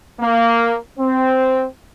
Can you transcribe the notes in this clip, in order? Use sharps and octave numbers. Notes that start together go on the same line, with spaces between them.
A#3
C4